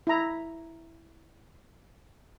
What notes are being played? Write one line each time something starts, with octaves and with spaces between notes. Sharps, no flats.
E4 A#5